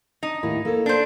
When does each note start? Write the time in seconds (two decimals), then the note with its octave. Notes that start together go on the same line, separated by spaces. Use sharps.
0.23 D4 D#4
0.43 D#2 A2 E4
0.65 A#3 A4 C#5
0.86 D4 C5